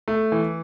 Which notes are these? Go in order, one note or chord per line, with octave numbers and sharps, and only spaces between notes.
A3
E3